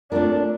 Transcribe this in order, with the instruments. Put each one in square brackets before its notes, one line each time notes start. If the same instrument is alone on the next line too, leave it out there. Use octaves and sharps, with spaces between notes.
[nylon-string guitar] A3 C4 F4 A#4 [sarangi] D4